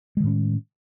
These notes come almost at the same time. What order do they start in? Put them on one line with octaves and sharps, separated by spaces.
G#3 D#3 A2 C#4